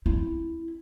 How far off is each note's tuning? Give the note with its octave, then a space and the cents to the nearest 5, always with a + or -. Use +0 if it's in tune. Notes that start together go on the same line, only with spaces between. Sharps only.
C4 +30 E4 +0